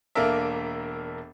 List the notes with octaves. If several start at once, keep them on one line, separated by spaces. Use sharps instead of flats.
E1 A#3 D4 A4 A#4 E5